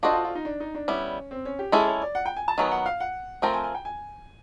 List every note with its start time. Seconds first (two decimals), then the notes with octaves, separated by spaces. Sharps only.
0.03 D4 F4 F#4 A4 C5 D#5
0.13 F4
0.25 F4
0.35 D#4
0.45 D4
0.60 D#4
0.75 D4
0.88 G3 B3 C#4 E4
1.31 C4
1.45 C#4
1.59 G4
1.72 G#3 C#4 E4 G#4 A4
1.88 C#5
2.02 D5
2.15 F#5
2.26 G5
2.36 G#5
2.48 A5
2.58 D#3 F#3 B3 G#5
2.72 F#5
2.86 F5
3.00 F#5
3.42 F3 A3 C4 F4 A#4 G5
3.53 G#5
3.64 G#5
3.75 G5
3.85 G#5